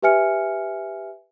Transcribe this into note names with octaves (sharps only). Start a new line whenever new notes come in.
G4 B4 E5 G#5 F6 C#7